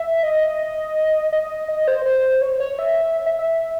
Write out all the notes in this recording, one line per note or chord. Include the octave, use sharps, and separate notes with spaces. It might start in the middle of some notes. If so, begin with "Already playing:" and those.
Already playing: E5
D#5
D#5
D#5
C5
C5
C#5
C#5
E5
E5
E5